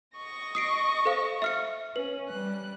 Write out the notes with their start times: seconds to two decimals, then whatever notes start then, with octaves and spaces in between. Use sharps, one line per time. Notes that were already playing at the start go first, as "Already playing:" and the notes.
0.17 D#5 C#6 A#6
0.55 D#6 C7 D7
1.05 A4 C5 F5
1.42 E5 F6 C#7
1.96 C#4 B4
2.30 G3 F#6